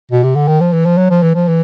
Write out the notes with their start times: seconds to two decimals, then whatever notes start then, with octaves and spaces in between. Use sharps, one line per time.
0.11 B2
0.23 C3
0.36 D3
0.48 D#3
0.60 F3
0.73 E3
0.85 F3
0.98 F#3
1.10 F3
1.23 E3
1.35 F3
1.48 E3